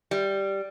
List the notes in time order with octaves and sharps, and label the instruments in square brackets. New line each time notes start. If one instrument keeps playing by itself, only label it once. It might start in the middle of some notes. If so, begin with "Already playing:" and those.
[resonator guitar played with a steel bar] G3